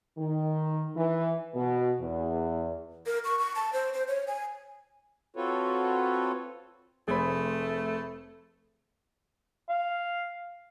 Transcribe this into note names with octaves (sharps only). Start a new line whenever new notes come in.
D#3
E3
B2
E2
A#4
C#6
C#6
A5
C5
C5
C#5
G#5
C4 F4 F#4 A4 B4 C#5
F1 A3 G#4 C5 B5
F5